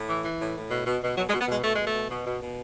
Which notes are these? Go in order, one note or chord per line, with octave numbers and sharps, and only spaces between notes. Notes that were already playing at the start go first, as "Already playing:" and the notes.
Already playing: A2
E3
E3
A2
A2
B2
B2
B2
B2 F#3
G#3
B2
B3
B2 G#3
B2 A3
B2 G#3
A3
B2
B2
B2
B2